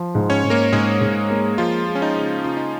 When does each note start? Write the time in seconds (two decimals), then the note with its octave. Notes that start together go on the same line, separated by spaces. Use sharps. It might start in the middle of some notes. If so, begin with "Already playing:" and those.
Already playing: F3
0.15 G#2
0.30 C#4 C#5
0.44 G#2
0.50 A#3 A#4
0.72 G#2 G#3 G#4
1.01 G#2
1.30 A#3
1.58 F3 G#3 F4
1.87 G#3
1.95 C#4
2.02 D#4
2.16 C#3
2.44 C#3 F4
2.57 D#4